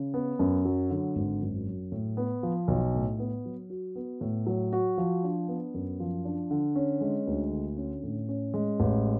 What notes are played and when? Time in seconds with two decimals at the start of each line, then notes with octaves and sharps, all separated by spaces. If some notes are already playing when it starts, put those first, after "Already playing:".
Already playing: C#3
0.14 B3
0.39 F#2
0.65 F#3
0.90 D3
1.16 G#1
1.42 F#2
1.67 F#3
1.92 A2
2.17 B3
2.43 F3
2.68 B1
2.95 A2
3.19 B3
3.46 F#3
3.70 F#4
3.95 B3
4.21 A2
4.47 F#3
4.73 F#4
4.98 F3
5.24 D4
5.48 B3
5.74 F#2
6.00 F3
6.25 D4
6.51 D3
6.76 C#4
7.01 G#3
7.27 D2
7.52 D3
7.77 C#4
8.04 A2
8.29 C#4
8.54 G#3
8.80 A1